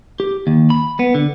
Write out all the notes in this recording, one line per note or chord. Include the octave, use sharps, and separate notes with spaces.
G4
D#2
B5
B3
D3